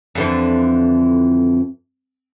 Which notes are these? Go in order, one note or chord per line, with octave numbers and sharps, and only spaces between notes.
F2 D3 E3